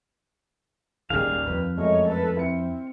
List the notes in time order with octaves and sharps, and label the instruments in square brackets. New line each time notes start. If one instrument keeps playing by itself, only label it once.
[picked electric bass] D#1 G#1 C#3 [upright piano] D#2 [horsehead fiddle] G3 G#4 [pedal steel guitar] F5
[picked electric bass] F2 [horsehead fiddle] B4
[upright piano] F#2 G#3 A3 [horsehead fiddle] C#5 D#5
[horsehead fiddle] A4 B4
[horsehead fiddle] C4 [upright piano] E4 C#7